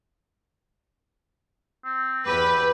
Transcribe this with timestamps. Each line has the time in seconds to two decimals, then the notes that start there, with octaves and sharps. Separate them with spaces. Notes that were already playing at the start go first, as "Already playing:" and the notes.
1.85 C4
2.26 E2 G4 B4